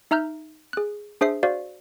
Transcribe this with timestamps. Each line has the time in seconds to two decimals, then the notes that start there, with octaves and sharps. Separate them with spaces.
0.11 D#4 E5 A#5 F6 G6
0.73 G#4 F#6
1.21 D4 G#4 C5 E5 D#6 C7
1.43 F#4 C5 D5 F5